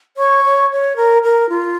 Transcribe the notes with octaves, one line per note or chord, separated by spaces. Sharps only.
C#5 C#6
C#5
C#5
A#4
A#4
F4